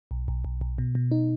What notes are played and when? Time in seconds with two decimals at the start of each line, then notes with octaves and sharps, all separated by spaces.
0.11 B1
0.28 B1
0.45 B1
0.61 B1
0.78 B2
0.95 B2
1.11 D#4